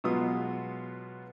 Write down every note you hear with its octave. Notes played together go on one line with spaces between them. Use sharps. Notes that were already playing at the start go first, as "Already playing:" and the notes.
B2 F#3 G#3 B3 F4 D#6